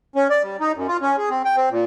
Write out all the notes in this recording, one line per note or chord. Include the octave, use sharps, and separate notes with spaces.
C#4
D5
G3
D#4
F#2
F4
C#4
G#4
C4
G5
C4
A#2